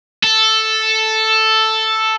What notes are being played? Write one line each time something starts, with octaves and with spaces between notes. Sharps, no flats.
A4